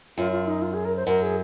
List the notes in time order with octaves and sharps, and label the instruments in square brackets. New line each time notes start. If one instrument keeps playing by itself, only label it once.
[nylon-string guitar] F#2 [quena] F4
[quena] F4
D#4
F4
G#4
A#4
C5
[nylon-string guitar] F#2 [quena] A#4
[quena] G#4